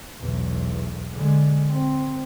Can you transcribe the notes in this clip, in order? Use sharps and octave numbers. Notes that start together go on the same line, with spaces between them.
B1 E2
D3 G#3
C4